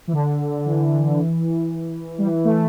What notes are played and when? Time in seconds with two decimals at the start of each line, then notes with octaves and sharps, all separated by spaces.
0.08 E3
0.13 D3
0.66 E3
2.18 G3
2.27 E3
2.45 A3